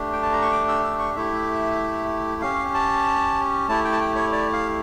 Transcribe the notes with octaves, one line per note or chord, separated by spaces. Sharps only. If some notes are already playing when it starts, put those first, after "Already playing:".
Already playing: A3 D4 G4
G5
A5
A#5
C#6
D6
E6
E6
C#6
A3 E4 G4 E5
C#4 G4 F5
A5
A3 E4 G4 A5
G5
A5
G5
C#5
D5
F5